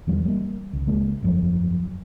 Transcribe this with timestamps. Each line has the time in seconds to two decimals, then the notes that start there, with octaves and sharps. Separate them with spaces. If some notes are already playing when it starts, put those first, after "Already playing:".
0.07 E2 E3 G3
0.25 G3 A#3
0.73 C#2
0.87 C#2 G#3 A#3
1.23 G1 F2 F#3